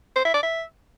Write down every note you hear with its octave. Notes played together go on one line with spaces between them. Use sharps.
C5
E5
D5
E5